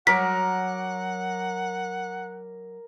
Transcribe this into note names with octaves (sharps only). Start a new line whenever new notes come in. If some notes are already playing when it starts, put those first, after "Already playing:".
F#3 A#4 F#5 D6 B6